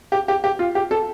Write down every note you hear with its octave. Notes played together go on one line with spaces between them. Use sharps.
G4
G4
G4
F4
G4
A4